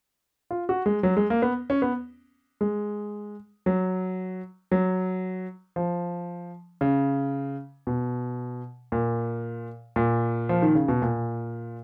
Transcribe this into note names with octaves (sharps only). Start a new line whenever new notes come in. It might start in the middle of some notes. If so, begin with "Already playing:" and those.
F4
F#4
G#3
F#3
G#3
A#3
B3
C#4
B3
G#3
F#3
F#3
F3
C#3
B2
A#2
A#2
F3
D#3
C#3
B2
A#2